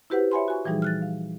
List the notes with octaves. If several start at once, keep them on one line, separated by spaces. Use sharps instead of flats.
E4 F#4 G4 B4 C5 F#5
C#5 E5 F#5 G#5 B5 C6
F#4 G#5 C#6
A#2 E3 F3 G3 D#4 G#4
F6 F#6 A6
F5